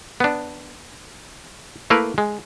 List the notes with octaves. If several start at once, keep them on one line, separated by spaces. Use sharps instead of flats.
B3 D4
A3 A#3 E4 A#4 B4
G#3